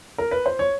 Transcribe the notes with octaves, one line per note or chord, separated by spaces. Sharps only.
A#4
B4
C5
C#5